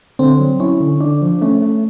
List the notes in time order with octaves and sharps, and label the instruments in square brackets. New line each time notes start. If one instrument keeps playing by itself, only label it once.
[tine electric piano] D3 [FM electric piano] C4
[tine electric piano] F#3
[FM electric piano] C#4 [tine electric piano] E4
[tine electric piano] D3
[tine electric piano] D3 [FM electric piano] D4
[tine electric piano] F3
[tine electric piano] A3 [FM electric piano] C#4
[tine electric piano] A3